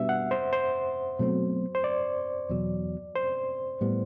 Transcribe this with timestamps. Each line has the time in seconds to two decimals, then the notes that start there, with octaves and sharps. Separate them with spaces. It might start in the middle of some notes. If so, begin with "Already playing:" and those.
Already playing: B2 G3 B3 D4 E5
0.09 F#5
0.31 C5
0.53 C5
1.19 B2 F#3 A3 C4
1.75 C5
1.84 D5
2.49 E2 B2 F#3
3.16 C5
3.81 A2 G3 B3